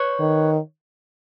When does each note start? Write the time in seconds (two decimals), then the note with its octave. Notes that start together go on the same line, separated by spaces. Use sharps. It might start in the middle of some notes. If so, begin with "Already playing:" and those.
Already playing: B4 C#5
0.20 D#3